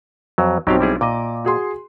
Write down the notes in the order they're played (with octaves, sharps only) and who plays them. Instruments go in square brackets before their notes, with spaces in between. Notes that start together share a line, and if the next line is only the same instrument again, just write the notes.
[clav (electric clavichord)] F2 F#3
[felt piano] B1 C4 [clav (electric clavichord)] F#3 G4 F5
[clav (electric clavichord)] G3 E4 G#4
[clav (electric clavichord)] A#2 D#5 [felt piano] D6
[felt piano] F#4 G#4 C6